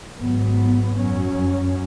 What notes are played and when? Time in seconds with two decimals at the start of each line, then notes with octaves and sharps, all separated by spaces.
0.17 G#1 G#2 F#3 B3
0.96 F#2 F#3 C#4